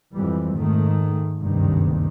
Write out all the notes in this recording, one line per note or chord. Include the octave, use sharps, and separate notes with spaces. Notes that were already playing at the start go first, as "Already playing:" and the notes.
F2 G#2 E3 G3
G#2 D#3 A3
F#1 D2 G2 C3 D#3